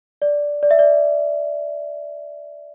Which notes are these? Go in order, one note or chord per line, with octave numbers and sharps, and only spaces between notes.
D5
D5
E5
D5